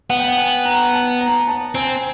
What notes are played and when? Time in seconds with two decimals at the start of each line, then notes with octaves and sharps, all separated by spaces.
0.10 B3 F#5
0.19 G5
0.28 F#5
0.38 G#5
0.65 A#5
0.93 A5
1.21 A#5
1.47 A5
1.75 C4 G#5